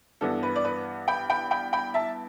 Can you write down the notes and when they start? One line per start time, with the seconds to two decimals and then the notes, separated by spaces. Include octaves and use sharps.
0.21 G2 E3 B3 D4 A4
0.43 B4
0.56 D5
0.65 B4
1.08 G5 B5
1.30 G5 B5
1.51 G5 B5
1.73 G5 B5
1.94 E5 A5